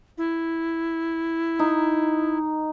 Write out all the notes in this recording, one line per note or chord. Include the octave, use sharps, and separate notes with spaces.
E4
D#4